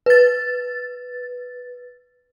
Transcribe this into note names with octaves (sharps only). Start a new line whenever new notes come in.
B4 A6